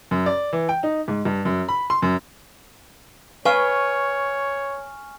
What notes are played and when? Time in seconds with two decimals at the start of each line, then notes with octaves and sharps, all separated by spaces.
0.11 F#2
0.26 D5
0.53 E3
0.69 G5
0.83 D#4
1.08 G#2
1.25 G2
1.45 F#2
1.69 B5
1.90 C6
2.02 F#2
3.45 B4 C#5 F5 G#5 C#6 F6